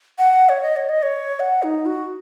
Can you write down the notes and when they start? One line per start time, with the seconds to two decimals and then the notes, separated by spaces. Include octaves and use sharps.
0.19 F#5
0.49 C#5
0.62 D#5
0.76 C#5
0.89 D#5
1.03 C#5
1.40 F#5
1.63 D#4
1.86 F#4